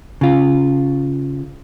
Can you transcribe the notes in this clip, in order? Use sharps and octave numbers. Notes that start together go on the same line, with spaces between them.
C#3 F4